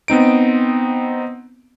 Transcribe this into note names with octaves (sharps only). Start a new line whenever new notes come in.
B3 C4 D#4 D7